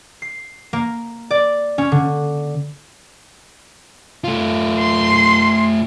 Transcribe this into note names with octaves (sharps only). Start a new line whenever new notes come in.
C7
A#3
D5
C#4
D3
A3 F4
C6